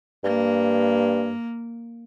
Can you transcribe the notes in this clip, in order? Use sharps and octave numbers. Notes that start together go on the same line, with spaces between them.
G2 A#3